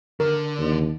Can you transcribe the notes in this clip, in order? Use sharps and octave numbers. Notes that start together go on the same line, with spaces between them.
D3 A#4
D#2